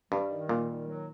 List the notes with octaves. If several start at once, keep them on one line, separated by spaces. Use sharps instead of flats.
G2 G3
D#3
A#2 G3
D#3
F#3